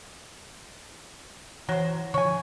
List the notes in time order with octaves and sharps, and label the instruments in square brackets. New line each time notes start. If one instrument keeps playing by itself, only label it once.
[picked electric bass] E3 [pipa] F#3 C5
[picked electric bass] D3 F3 [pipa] C#5 G#5